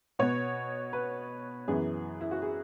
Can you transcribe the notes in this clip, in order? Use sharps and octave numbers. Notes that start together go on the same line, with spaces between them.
B2 B3 C#5
B4
F#2 E3 B3 G#4
E4
F#4
G#4